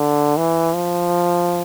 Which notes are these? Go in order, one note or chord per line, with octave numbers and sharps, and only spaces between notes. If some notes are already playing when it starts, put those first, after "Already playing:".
Already playing: D3
E3
F3